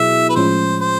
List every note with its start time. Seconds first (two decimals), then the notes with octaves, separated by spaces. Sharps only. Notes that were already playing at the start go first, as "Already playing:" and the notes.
Already playing: B2 F#3 B3 E4 G#4 E5
0.29 B4
0.36 A2 F3 G#3 C#4 C5
0.81 C5